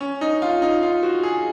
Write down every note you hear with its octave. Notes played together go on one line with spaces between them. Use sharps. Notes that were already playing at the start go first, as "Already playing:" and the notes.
C#4
D#4
F4
D#4
F4
F#4
G#4